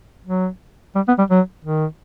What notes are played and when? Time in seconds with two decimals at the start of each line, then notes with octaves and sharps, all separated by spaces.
0.27 F#3
0.96 G3
1.08 B3
1.18 G3
1.30 F#3
1.65 D#3